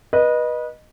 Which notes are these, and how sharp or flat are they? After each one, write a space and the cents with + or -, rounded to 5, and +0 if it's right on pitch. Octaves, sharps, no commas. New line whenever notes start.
B4 -25 D#5 -15